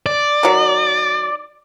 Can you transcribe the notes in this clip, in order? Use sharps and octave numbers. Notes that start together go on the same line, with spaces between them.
D5
D#3 F#3